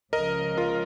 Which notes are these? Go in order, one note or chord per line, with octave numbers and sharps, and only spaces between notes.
C#2 C#3 F3 A#4 D#5
F4 A#4